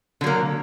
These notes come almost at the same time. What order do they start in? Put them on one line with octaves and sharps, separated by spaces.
D3 F#3 A#3